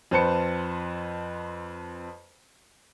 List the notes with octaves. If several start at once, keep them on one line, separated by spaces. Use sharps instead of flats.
F2 B4 C5 A5 C#7